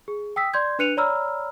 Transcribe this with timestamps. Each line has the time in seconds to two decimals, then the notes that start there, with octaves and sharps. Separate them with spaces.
0.08 G#4
0.36 G5 D#6 E6 B6
0.54 D5 C6 G6 G#6
0.79 D4 B4 F#6 C#7 D#7 F7
0.97 C#5 D5 A#5 B5 E6 F6